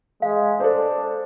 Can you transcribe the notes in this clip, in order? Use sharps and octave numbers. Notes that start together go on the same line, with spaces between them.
G#3 F5
D4 A4 C5